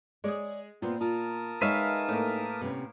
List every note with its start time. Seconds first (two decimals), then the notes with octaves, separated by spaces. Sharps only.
0.24 G#3 G#4 C#5 D5
0.82 A#2 B3 C4 F4
1.01 F4 A#4 A5 D#6
1.62 G#3 D#4 B4 C#5 E5 F5 G#5
2.08 A2 A#3
2.61 C3 B3 C#4